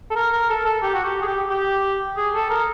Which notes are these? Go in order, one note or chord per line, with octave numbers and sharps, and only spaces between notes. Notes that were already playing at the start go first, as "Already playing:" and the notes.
A4
A#4
A#4
A4
A4
G4
F#4
G4
G#4
G4
G4
G#4
A4
A#4